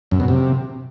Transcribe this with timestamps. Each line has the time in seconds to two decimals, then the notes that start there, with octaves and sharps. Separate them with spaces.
0.11 F#2
0.20 B2
0.28 C3